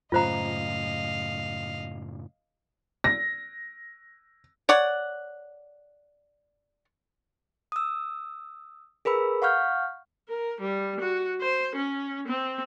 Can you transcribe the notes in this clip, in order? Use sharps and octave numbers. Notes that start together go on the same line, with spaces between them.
F#2 A2 C#3 F4 C5 D#5 F5 A#5
A#6
C#5 D5 F#5
D#6 E6
G#4 A#4 B4 B5 E6
F5 F#5 C#6 F6 G6
A#4
G3
F#4
C5
C#4
C4